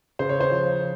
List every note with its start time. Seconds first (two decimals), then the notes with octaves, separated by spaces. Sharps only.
0.19 C#3 C5
0.29 C#5
0.41 C5
0.51 F3